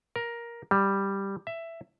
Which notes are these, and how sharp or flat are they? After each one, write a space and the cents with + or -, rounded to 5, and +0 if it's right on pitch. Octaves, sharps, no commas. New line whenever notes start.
A#4 +10
G3 +5
E5 +10